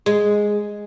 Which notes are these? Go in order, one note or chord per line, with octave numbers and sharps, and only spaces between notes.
G#3